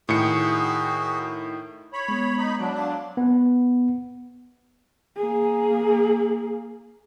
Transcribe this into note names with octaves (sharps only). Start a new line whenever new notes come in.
A2 D#3 F#4 G#4 C#7
C#5 B5
G#3 B3
D#4 B5
F#3 D4 D5
D5 F5 C6
B3
A#3 G#4